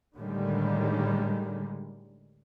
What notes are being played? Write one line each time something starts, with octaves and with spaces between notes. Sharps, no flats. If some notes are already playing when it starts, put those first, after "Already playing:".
A2 D3 D#3 G3 G#3